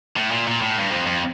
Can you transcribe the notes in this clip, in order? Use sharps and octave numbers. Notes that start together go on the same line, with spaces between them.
A2
A#2
A#2
A2
G2
F2
F2